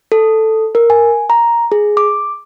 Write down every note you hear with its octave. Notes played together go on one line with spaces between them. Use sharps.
A4
A#4
G#5
A#5
G#4
D6